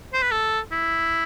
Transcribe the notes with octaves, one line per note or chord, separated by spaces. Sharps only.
C5
B4
A4
E4